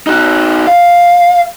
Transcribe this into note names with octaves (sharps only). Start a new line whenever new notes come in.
D#4 F#4
F5